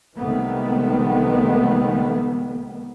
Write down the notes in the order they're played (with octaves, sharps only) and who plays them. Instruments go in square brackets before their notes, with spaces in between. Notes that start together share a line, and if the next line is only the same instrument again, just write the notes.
[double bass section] C2 D#3 E3 G#3 A3 B3